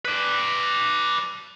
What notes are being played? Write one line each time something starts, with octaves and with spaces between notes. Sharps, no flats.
B4 D5